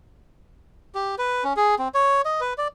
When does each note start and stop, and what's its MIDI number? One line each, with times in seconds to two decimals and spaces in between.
0.95 1.15 67
1.18 1.44 71
1.44 1.53 61
1.57 1.75 68
1.79 1.88 60
1.94 2.22 73
2.25 2.41 75
2.41 2.53 71
2.58 2.68 74